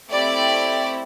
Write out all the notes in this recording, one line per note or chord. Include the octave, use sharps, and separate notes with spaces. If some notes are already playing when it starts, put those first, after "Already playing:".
A3 C4 E4 G4 D5